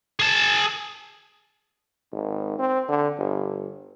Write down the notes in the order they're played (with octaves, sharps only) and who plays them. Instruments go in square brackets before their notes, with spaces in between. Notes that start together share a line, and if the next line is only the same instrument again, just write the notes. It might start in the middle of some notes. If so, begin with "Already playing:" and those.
[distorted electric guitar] G#4 A5
[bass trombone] G#1
C4
D3
G1